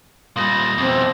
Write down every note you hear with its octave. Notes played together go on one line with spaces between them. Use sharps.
A#2 G3 C6 D#6 A#6
F2 B2 C4